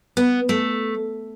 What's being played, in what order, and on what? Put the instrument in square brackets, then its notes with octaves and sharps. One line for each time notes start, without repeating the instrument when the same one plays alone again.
[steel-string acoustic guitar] B3
A3